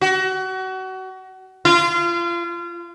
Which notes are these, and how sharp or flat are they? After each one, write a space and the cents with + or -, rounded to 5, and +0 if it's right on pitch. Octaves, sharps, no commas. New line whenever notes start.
F#4 +30
F4 -30